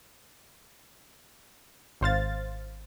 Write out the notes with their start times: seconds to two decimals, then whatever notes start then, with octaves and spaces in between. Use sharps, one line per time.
2.01 G#1 C5 F5 A6